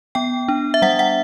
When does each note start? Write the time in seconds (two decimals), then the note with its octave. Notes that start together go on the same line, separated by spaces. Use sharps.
0.15 B3 G5
0.48 D4
0.74 E5
0.82 G3 F#5
0.99 F#5